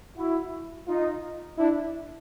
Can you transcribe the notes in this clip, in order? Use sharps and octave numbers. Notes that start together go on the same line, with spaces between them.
E4 F#4
D#4 F4
D4 E4